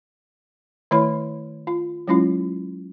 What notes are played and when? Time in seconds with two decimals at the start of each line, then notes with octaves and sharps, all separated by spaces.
0.91 D#3 A3 E4 C#5 B5
1.67 F4
2.07 F#3 G#3 C#4 E4 F4